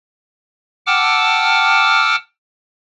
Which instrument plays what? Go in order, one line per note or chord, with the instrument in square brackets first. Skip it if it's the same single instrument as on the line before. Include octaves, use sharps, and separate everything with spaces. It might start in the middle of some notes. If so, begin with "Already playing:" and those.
[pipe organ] F#5 G5 A5 D6 E6 F6